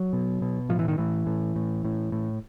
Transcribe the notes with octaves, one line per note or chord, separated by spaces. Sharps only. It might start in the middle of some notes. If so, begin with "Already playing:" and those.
Already playing: F#3
B2
B2
A2 F3
E3
D#3
A2 E3
A2
A2
A2
A2